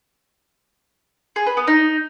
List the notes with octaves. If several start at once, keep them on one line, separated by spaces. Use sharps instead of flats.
G#4
B4
B3
D#4